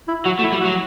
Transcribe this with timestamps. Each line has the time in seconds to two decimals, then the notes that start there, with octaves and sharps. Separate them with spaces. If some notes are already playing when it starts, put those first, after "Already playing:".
0.08 E4
0.25 F#3 F#4
0.39 A3
0.44 E4
0.52 G3
0.61 F#4
0.65 F#3